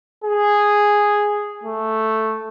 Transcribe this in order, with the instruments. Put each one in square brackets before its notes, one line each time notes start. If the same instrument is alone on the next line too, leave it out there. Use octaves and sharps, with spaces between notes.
[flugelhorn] G#4
A3